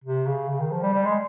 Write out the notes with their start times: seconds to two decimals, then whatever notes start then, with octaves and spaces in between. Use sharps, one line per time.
0.04 C3
0.27 C#3
0.49 C#3
0.60 D#3
0.71 F3
0.82 G3
0.93 G3
1.04 G#3